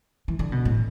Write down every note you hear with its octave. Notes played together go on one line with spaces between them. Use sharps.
E3
D3
B2
A2